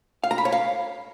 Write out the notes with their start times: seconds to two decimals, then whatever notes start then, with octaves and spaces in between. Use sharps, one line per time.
0.24 F5
0.31 A#5
0.38 B5
0.45 C#5
0.52 F5